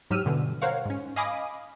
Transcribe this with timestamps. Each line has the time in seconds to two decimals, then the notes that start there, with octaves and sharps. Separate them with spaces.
0.10 G#2 F#3 G4 E6 F6 D#7
0.25 G2 B2 D3 E3
0.61 A#4 C5 C#5 F5 F#5
0.86 G#2 C#4
1.16 D#5 F5 G#5 B5 D6 D#6